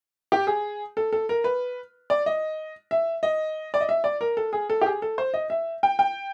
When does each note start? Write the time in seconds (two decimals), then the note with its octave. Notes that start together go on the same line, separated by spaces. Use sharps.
0.32 G4
0.47 G#4
0.97 A4
1.12 A4
1.29 A#4
1.44 B4
2.10 D5
2.26 D#5
2.91 E5
3.23 D#5
3.74 D5
3.81 D#5
3.89 E5
4.04 D5
4.21 A#4
4.37 A4
4.53 G#4
4.70 A4
4.81 G4
4.86 G#4
5.02 A4
5.18 C5
5.34 D#5
5.50 E5
5.83 G5
5.99 G5